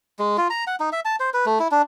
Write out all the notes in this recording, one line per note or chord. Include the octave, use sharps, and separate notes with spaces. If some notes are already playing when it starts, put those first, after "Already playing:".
G#3
F4
A#5
F#5
D#4
E5
A5
C5
B4
A3
E4
D4